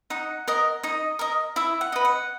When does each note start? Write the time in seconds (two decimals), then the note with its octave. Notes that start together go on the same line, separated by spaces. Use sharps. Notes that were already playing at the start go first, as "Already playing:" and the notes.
0.10 D#4 F#5
0.48 A#4 D#5
0.83 D#4 D#5
1.19 A#4 D#5
1.56 E4 E5
1.81 F#5
1.92 B4 D#5
2.05 F#5